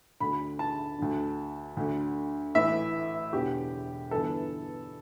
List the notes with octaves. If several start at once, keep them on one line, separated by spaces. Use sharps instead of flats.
D2 D3 B5
A5
D2 D3
D2 D3
A1 A2 E3 E5
E1 E2 D3 G4
G1 G2 E3 A4